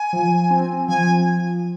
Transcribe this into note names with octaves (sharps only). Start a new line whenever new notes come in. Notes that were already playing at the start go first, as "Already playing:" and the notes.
Already playing: G#5
F3
C4
F3 G#5